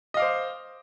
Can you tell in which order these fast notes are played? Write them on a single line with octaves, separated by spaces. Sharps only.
D#5 F5 D6 C5